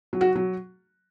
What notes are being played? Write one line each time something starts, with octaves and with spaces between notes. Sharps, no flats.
F#3
F#4
F#3